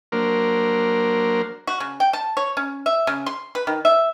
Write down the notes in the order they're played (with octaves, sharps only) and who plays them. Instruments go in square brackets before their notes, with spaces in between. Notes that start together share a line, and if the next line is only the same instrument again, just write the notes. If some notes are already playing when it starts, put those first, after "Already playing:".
[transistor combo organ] F#3 A#3 D4 A#4 C5
[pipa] F#4
C#3
G5
A5
C#5
C#4
E5
C#3
C6
B4
D#3
E5